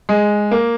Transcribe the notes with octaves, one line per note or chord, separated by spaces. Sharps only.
G#3
A#3